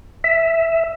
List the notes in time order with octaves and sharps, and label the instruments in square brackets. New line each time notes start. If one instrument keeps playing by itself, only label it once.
[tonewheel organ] E5